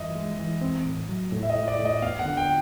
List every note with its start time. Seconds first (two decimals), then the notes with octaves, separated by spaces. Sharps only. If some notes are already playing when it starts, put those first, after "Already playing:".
Already playing: G2 E3 D#5 E5
0.16 G#3
0.39 E3
0.61 C4
0.86 A2
1.09 F#3
1.32 A2
1.43 E5
1.50 D#5
1.56 A2
1.68 D5
1.79 A2
1.85 D#5
2.02 B3 F5
2.19 F#5
2.26 D3
2.37 G5